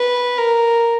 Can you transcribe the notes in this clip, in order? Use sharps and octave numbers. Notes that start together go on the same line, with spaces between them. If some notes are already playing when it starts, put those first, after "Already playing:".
Already playing: B4
A#4